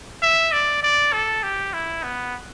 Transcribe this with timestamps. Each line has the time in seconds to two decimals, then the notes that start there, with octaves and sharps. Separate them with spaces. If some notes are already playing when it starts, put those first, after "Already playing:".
0.22 E5
0.52 D5
0.83 D5
1.13 A4
1.43 G4
1.73 E4
2.03 B3